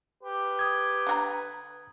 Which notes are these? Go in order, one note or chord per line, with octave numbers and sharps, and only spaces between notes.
G4 B4
D#6 G#6
D3 F#4 A#5